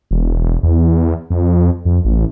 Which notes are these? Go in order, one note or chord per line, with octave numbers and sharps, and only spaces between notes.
E1
E2
F2
F2
A1